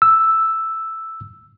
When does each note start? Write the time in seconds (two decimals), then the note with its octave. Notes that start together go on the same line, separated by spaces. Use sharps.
0.02 E6